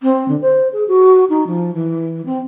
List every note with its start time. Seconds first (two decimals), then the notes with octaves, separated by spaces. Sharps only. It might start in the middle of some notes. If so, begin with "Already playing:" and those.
0.02 C4
0.28 D3
0.42 C5
0.73 G#4
0.88 F#4
1.30 D#4
1.47 F3
1.74 E3
2.26 C4